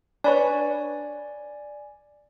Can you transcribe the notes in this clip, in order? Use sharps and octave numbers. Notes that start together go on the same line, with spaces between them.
D4 B4 C#5 D5 G#5